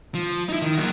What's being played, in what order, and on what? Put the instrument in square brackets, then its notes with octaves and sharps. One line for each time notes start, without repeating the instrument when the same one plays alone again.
[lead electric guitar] F3
D#4 E4
D#3
F#3 A#3